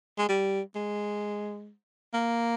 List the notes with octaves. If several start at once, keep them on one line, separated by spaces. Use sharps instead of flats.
G#3
G3
G#3
A#3